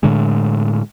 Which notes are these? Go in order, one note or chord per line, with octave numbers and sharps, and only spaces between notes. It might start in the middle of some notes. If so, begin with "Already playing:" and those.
A2 D3 G#3